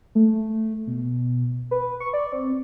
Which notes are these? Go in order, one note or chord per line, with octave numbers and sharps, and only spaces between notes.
A3
B2
B4
C#6
D5
C4